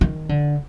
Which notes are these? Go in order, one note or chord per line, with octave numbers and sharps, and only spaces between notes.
D#3
D3